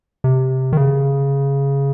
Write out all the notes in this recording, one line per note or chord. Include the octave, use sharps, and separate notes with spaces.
C3
D#3
C#3